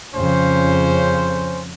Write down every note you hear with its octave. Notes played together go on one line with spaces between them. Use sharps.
F2 C#3 C#4 C5